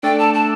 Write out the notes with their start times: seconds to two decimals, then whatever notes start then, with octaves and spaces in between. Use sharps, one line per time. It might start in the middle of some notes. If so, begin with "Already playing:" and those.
0.03 A3 D4 A4 D5 G5
0.19 A5
0.34 A5